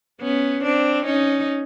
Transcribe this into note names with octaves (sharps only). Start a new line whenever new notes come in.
B3 C#4
C4 D4
C#4 D#4